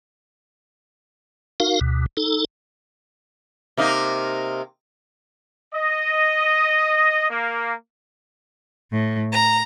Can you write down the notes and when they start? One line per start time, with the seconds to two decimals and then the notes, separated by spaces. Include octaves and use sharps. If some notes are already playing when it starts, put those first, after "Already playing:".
1.60 D#4 F#4 A#4 F5
1.81 D2 B2
2.17 D#4 A4
3.77 C3 A#3 D#4
5.74 D#5
7.30 A#3
8.93 A2
9.33 A#5